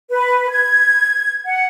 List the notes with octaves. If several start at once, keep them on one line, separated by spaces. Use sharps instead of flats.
B4
G#6
F#5